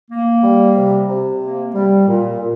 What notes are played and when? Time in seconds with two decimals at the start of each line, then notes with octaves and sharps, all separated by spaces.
0.11 A#3
0.44 G3
0.77 C3
1.09 C3
1.42 A#3
1.74 G3
2.07 A#2
2.40 A#2